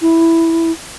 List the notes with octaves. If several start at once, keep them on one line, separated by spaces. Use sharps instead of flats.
E4